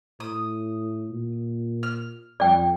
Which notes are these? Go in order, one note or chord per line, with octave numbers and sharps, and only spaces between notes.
A2 D#6
A#2
F6
F2 D5 G5